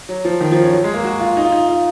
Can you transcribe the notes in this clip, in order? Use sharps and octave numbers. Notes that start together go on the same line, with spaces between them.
F#3
F3
D#3
F3
C#4
F#3
G#3
A#3
F#4
F4
D#4
F4
D#4
F4